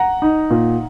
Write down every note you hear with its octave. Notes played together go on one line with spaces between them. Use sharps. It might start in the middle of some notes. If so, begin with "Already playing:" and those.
Already playing: F#5 A#5
D#4
A#2